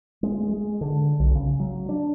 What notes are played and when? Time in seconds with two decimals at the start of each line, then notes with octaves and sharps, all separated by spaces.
0.23 G#3
0.49 G#3
0.81 D3
1.19 B1
1.35 C#3
1.60 F#3
1.89 D4